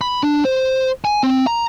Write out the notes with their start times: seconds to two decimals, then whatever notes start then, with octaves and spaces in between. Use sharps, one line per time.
0.01 B5
0.23 D4
0.45 C5
1.05 G#5
1.23 C4
1.47 A#5